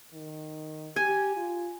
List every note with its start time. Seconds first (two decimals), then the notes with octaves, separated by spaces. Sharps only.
0.13 D#3
0.96 G4 G#5
1.36 F4